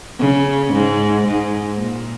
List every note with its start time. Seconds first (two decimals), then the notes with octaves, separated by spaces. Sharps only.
0.20 C#3
0.73 G#2
1.27 G#2
1.81 A#2